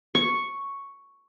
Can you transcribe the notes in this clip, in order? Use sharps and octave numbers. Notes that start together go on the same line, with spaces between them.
C#6